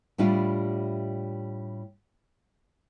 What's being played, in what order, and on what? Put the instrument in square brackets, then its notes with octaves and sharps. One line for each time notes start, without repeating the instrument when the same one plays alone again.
[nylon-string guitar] A2 G3 D4 E4 F4